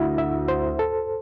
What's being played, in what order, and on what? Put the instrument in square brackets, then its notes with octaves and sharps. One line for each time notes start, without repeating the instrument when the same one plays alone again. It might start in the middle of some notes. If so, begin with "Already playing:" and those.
Already playing: [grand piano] D2 D3 [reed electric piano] E4
[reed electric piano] E5
C5
A4